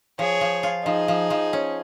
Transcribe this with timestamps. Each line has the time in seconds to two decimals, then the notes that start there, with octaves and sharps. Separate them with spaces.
0.18 F3 G#4 C#5
0.41 F3
0.63 F4
0.85 F3 D#4 G#4
1.08 F3
1.30 F3
1.53 C#4